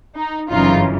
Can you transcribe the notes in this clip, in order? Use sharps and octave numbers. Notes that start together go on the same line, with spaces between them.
D#4
G1 F#2 C#3 E3 D#4 F4